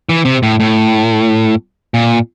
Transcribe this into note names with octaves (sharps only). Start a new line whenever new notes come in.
E3
C3
A2
A2
A#2